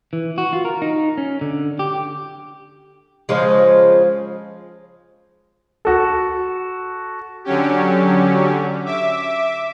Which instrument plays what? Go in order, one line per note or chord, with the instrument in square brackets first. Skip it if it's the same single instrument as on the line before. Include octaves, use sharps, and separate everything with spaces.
[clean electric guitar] E3
F#4
F4
A#4
D#4
C#4
D3
G4
[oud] C#3 F3 G#3
[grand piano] F#4 A4
[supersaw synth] D3 F#3 C#4 G4
E5 D6